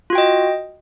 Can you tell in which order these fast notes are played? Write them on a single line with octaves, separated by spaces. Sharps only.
F4 F#4 G5 D#5